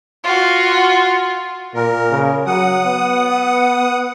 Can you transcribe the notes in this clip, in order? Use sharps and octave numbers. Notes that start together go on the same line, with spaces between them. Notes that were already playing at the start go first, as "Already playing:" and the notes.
F4 F#4
A#2 A#4
C#3
F#3 F#5 D#6
B3